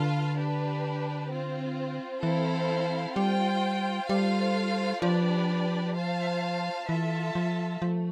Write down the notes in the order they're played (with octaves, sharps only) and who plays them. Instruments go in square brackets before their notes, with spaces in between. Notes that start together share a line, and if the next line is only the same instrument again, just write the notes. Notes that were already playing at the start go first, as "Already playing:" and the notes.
Already playing: [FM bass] D3 [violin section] F4 B4 F5 A5
[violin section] D4 G4 B4
C4 F4 C5
[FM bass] E3 [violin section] C4 E4 A4 C5 F5
[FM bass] G3 [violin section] F4 C5 G5
[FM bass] G3 [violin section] F4 A4 C5 F5
[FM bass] F3 [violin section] D4 G4 B4 D5
[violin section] F4 C5 F5 A5
[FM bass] E3 [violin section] F4 A4 E5 A5
[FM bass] F3
[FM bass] F3 [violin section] A3